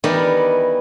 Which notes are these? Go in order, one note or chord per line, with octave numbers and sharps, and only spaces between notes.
D#3 E3 G3 B3 A#4 D5